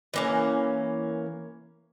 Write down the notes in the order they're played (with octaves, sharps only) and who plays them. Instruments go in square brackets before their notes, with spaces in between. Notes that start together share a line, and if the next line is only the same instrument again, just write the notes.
[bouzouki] E3 A#3 C#4